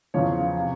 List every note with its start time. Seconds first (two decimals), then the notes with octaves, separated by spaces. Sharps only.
0.14 E2 C#3 F3 C#5
0.59 C3